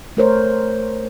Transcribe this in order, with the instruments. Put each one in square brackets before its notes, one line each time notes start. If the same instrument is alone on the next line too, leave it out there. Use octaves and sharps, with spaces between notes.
[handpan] A3 A#4 C5 C#5